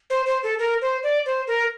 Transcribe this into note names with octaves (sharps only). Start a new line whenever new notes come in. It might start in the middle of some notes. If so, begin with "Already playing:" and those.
C5
C5
A4
A#4
C5
D5
C5
A#4